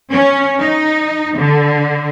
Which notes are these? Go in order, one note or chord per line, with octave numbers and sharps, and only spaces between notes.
C#4
D#4
D3